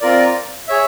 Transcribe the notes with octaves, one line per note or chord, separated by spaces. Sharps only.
C4 F4 A#4 D5
G#4 C#5 E5